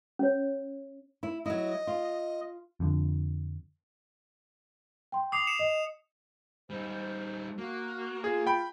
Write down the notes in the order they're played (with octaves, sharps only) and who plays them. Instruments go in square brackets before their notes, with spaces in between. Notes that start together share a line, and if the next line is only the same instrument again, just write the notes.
[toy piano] C#4 C#5
[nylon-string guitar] E4
[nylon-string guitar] F#3 E4 [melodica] D#5
[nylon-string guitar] F4
[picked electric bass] F2 D3
[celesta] G5 C6
[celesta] D6 [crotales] D#6 C7 F7
[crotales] C#7 E7
[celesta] D#5
[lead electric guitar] G3 D#4 [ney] C5
[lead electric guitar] A#3 [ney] F#4
[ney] F4 [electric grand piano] G#4
[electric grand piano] G5 B5